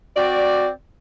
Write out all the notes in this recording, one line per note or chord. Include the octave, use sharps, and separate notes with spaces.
C4 F#4 D5